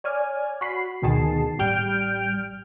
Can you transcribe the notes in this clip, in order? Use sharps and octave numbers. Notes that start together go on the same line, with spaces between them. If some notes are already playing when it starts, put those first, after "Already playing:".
C#5 D5 G#5 F6
F#4 B5 C7
D2 B2 D#3 G#4 A5 C7
A1 G3 G5 F6 G6 D7